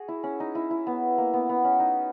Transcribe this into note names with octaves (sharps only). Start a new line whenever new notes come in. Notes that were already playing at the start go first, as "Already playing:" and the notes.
Already playing: F#4 G#4
E4
C#4
D#4
E4
E4
B3
A#3
B3
B3
C#4
D#4